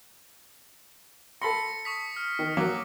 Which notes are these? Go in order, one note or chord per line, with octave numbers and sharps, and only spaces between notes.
A4 B5 C6 A#6 C#7
C#6 D#6 B6
F6
D#3
F#3 A#3 D6